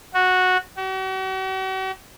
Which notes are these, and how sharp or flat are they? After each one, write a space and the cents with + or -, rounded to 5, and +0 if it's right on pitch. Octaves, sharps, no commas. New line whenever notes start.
F#4 -10
F#4 +45